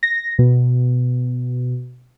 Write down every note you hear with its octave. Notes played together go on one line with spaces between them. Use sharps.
A#6
B2